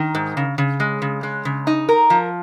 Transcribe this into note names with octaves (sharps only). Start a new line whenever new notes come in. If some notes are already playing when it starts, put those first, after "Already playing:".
Already playing: D#3
G#2
C#3
C#3
G#3
C#3
G#3
C#3
D#4
A#4
F3